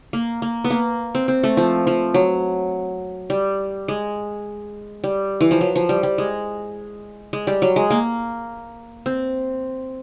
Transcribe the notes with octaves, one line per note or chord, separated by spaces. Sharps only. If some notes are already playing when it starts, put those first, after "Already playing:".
A#3
A#3
B3
A#3
C4
C4
A3
F3
F3
F#3
G3
G#3
G3
E3
F3
F#3
F3
G3
G3
G#3
G#3
G3
F#3
G#3
A#3
C4